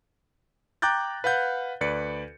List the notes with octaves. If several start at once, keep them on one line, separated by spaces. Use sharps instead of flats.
G5 A#5 D6 F#6 G6 A6
B4 F5 F#5 G6
D2 B4 D5 C#7